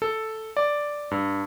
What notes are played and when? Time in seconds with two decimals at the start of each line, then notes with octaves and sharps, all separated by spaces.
0.02 A4
0.57 D5
1.11 G2